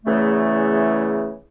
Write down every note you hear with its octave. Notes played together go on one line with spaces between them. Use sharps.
E2 C#3 E3 A3